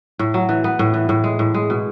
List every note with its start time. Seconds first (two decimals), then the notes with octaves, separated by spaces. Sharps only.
0.19 A2
0.34 F#3
0.49 E3
0.64 B3
0.79 A2
0.94 E3
1.09 A2
1.24 G#3
1.39 A2
1.54 G#3
1.70 B2